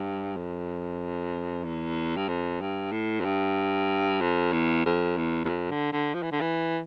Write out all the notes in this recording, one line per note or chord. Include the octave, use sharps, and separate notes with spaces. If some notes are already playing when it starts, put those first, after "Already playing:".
Already playing: G2
F2
E2
G2
F2
G2
A2
F2
G2
F2
E2
F2
E2
E2
F2
D3
D3
F3
E3
D3
E3